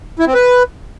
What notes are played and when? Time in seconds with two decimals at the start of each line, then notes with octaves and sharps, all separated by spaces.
0.19 E4
0.27 C4
0.34 B4